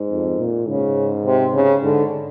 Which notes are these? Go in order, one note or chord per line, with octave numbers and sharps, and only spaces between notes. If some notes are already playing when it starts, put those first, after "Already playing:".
Already playing: G#2
F2
A#2
G#2 C#3
C3
C#3
G#2 D3